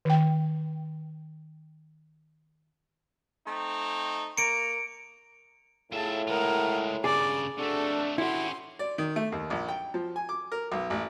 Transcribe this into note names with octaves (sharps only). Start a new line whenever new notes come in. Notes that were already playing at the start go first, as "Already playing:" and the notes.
D#3 G5
A3 C4 D#4
A#3 A#5 C#7 D7
A2 F4 G#4 E5 A5
G#3 F4 A#4 F#5
G2 C#3 G#4 D5
C3 A3 D4 F#4 A4
C#4 E4 F#4 G4 C6
D5
D#3
A3
D#2
A#1
G5
F3
G#5
D6
A#4
B1
A1